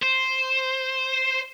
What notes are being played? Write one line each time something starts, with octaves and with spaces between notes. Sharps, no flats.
C5